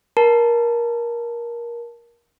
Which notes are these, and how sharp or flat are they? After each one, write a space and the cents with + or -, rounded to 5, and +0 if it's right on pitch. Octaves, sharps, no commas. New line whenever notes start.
A#4 +20 A5 +0